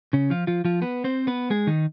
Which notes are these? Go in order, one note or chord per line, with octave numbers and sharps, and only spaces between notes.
C#3 C#4
F3 F4
F3 F4
F3 F4
B3 B4
C4 C5
B3 B4
G#3 G#4
D#3 D#4